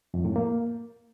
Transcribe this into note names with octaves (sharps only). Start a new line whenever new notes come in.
F2
A2
A#3